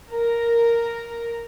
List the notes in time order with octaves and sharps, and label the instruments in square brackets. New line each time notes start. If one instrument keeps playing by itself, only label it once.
[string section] A#4